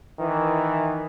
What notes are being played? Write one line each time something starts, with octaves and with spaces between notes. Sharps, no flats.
D#3 E3